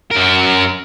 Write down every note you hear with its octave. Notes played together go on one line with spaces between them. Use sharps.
F#2 A#4